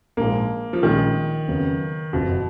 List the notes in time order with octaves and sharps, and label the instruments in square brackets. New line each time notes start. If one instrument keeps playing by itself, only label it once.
[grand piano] A#1 G#2 F3 G#3 [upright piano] A#3
[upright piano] F3
[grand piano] A#1 A#2 G#3 C#4 [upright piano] D#3
[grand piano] F2 C#3 F#3 B3
[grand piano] F#1 F2 F3 [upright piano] B2